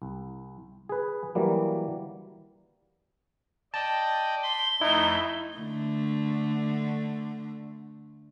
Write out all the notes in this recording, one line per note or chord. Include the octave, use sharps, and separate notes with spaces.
C2
G#4 B4
E3 F#3 G3 A#3
D5 D#5 G5 A5
B5 C6 G7
F2 A3 D#4 E4 E5
D3 A3